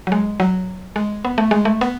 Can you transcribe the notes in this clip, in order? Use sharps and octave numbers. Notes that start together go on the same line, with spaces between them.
F#3
G#3
F#3
G#3
B3
A3
G#3
A3
B3